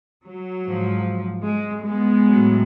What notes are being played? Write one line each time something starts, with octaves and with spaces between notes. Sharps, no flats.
F#3
G#2 F3
G#3
G#3 B3
A2 F#3